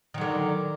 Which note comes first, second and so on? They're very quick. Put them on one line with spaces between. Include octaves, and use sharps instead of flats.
D#3 F#3 D3